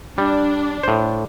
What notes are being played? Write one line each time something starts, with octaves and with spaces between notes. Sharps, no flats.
G3 D4
A2 C5